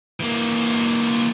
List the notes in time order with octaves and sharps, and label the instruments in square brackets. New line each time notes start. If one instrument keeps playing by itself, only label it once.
[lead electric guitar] E3 A#3